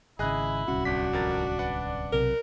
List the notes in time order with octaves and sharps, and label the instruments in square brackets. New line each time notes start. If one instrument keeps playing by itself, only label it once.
[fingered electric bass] G#1 C#3 [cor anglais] E4 [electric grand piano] G#4 D#5 F#6
[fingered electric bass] D1 C2 C#4 [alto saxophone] F#4
[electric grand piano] G1 B6 [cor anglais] D4
[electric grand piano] F2 A#4 A6
B4 D5 F#5
[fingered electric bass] B1 C3 [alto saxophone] A#4